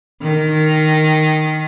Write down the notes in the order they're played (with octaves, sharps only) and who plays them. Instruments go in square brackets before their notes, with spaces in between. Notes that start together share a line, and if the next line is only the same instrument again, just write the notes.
[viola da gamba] D#3